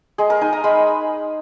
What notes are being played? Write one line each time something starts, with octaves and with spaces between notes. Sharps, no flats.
G#3 G#4
A#4
D#4 G#5
A#5
G#3 B5